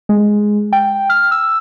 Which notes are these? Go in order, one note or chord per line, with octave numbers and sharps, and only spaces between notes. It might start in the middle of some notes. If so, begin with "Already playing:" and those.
G#3
G5
F6
E6